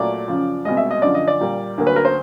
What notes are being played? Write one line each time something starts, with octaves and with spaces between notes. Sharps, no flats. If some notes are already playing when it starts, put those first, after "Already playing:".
Already playing: A#2 F#3 A3 D5
F#2 C#3 F3
C2 B2 G#3 D#5
E5
D#5
F#2 D3 F3 D5
D#5
D5
A#2 G3 A#3
D2 D3 F#3 A#3
B4
A#4
C5